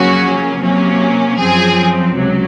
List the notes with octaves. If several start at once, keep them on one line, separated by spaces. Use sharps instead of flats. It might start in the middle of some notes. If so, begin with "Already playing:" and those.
Already playing: F2 C#3 F#3 A#3 C#4 F#4
C3 F#3 A#3 C#4
F#2 F3 C4 G#4
C#2 C3 F#3